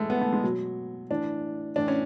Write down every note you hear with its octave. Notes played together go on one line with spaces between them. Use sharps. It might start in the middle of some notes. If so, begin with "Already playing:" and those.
Already playing: A2 E3 G#3 A3
B3
A3
G#3
B2 F#3
A2 E3 D4
A2 E3 D4
C#4